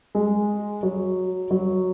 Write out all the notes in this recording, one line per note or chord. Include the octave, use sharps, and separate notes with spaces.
G#3
F#3
F#3